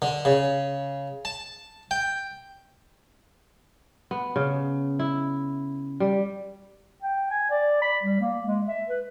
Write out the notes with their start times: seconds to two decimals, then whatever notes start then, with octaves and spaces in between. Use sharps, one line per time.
0.02 D3
0.25 C#3
1.25 A5
1.91 G5
4.11 B3
4.36 C#3
4.99 E4
6.00 G3
7.02 G5
7.30 G#5
7.50 D5
7.82 B5
8.03 G3
8.21 A#3
8.45 G#3
8.67 E5
8.89 B4